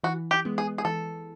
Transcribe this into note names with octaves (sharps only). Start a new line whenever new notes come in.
E3 F#4
G4
G#3 B3
G#4
G#4
E3 A4